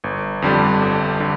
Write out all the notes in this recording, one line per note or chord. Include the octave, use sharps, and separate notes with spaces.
G1
F2 D3 G3
G1
D3